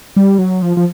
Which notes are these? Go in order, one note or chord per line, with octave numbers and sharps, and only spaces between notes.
G3
F#3
F3
F3